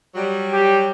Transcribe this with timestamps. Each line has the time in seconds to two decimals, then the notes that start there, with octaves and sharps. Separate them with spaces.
0.15 F#3 G3
0.53 G4